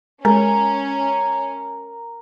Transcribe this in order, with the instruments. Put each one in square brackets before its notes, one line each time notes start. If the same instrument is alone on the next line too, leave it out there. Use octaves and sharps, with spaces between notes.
[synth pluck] G#3 [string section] C#4 [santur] A#4